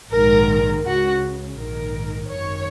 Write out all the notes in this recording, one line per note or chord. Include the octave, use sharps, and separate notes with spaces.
A#1 G#2 D#3 A#4
C#2 C#3 F#4
A#1 G#2 D#3 A#4
G#1 F#2 D#3 C#5